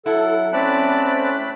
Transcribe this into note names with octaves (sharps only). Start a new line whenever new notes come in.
F#3 E4 A4 F#5
A3 C4 C#4 D5 A5 B5 F#6